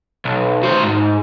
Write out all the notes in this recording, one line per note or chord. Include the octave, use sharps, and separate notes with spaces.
B1
F#4 C5
G#2